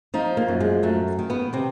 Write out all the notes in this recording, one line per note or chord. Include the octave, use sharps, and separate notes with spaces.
F3 D#4
A#3
F#2
G#3
F#2 A3
D#3
B3
C3 C4